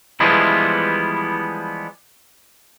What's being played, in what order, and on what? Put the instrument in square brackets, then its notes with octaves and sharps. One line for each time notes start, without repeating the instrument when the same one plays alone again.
[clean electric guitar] E3 F3 G3 G#3 B3 E4